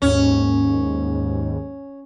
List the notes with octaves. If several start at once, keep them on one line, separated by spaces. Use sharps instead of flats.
D#2 G#2 C#4